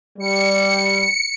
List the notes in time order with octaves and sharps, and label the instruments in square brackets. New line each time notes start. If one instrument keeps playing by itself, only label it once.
[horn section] G3 [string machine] C#7